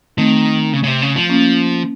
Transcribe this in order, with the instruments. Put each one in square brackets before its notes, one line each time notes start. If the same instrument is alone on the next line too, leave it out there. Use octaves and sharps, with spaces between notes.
[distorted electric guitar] D#3 [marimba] A3 C4
[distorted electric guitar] C#3
C#3
C3
C#3
F3
[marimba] A#3 C#4